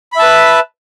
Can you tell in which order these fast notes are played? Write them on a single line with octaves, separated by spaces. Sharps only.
B5 E5 A5 B4